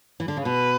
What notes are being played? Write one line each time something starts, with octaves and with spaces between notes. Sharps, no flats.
E3
D3
C#3
B2 B4